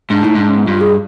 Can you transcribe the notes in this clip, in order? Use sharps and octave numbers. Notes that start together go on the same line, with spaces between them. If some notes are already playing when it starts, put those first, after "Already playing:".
G#2 D4
A2 D#4
G#2 D4
C#4
B3
G2 F4
G#4